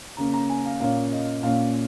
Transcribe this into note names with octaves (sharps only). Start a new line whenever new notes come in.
C#3 A#3 C#4 A#5
A#5
G#5
F5
A#2 A#3 C#4 F5
D#5
A#2 A#3 C#4 F5